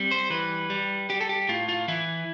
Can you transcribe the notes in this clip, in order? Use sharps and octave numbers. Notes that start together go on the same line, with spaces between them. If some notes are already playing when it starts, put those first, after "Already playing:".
Already playing: G3 C4
C5
E3 B4
G3
G3 G4
A4
G4
A2 F4
F4
E3 E4